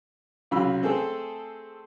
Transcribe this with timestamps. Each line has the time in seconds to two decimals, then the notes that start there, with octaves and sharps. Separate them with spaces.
0.51 C2 C#3 F#3 F4 B5 E6
0.82 A3 C4 G#4 A4